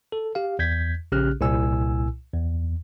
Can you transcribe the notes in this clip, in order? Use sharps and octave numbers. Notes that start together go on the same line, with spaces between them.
A4
G4 F5
E2 G6 G#6 B6
A#1 C#3 C#4 G4 F6 F#6
C2 A#2 E4 G#5 E6
E2